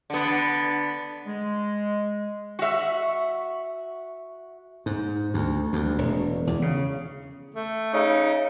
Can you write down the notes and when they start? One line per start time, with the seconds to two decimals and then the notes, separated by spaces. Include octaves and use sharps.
0.10 D3 B3
1.26 G#3
2.59 F#4 E5
4.86 G#2
5.34 D2
5.73 D2
5.98 E1
6.47 E2
6.62 C#3
7.54 A3
7.94 C#3 D#4